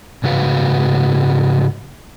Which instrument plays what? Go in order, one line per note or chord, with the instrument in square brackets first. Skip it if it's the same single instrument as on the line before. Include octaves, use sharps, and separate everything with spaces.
[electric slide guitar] G#2 C#3 F#4 B4 F5